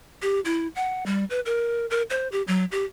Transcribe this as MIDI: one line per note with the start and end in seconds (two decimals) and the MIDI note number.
0.22 0.40 67
0.45 0.68 64
0.75 1.04 78
1.06 1.24 55
1.30 1.40 71
1.46 1.86 70
1.91 2.02 70
2.10 2.28 72
2.32 2.42 67
2.48 2.65 54
2.72 2.84 67